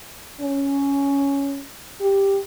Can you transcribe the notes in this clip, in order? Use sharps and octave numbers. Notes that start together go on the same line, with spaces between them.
C#4
G4